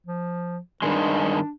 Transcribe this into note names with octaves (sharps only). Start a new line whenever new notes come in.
F3
G2 D#3 G#3 D4